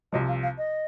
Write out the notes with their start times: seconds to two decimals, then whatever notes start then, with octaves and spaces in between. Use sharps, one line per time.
0.12 C2 C3 F3 D#5
0.28 F5
0.43 F5
0.58 D#5